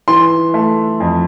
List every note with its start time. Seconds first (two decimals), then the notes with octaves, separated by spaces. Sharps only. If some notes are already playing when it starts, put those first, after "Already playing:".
0.08 E3 C6
0.54 A3
1.00 F2